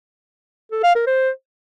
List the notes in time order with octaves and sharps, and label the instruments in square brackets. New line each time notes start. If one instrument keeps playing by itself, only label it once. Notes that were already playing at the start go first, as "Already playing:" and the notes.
[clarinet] A4
F5
A#4
C5